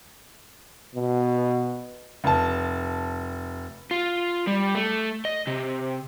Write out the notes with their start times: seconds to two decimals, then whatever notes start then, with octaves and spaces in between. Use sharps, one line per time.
0.95 B2
2.24 F1 A5
3.91 F4
4.47 G3
4.75 A3
5.25 D#5
5.47 C3